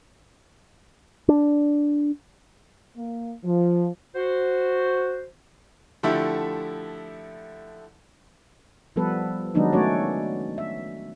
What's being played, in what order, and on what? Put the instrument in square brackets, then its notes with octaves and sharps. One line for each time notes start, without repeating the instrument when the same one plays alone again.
[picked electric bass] D4
[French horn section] A#3
F3
[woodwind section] F#4 C5
[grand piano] D3 F3 A3 E4 G4
[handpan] F3 G3 B3 A4 B4
D#3 F#3 G#3 B3 D4 D#4
A3 C#4 F#4 C#5 D5
E5